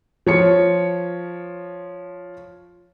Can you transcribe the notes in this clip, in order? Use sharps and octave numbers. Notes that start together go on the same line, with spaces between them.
F3 C#5 C#7